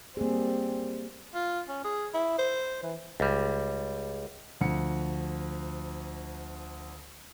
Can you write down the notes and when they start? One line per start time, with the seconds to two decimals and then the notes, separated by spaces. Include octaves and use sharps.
0.17 G3 A#3 C4 G#4
1.34 F4
1.68 C#4
1.84 G#4
2.14 E4
2.38 C5
2.83 E3
3.20 C#2 G3
4.61 D2 F3 C#7